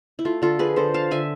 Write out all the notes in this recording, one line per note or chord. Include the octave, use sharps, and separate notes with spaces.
E4
A3 F4
D3 F4 A4
F3 G#4 B4
D3 A4 C5
D4 F5 A5
D3 E5 G#5